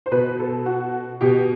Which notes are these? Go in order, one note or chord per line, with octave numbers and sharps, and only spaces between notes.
C5
B2 B4
A4
F#4
B2 G4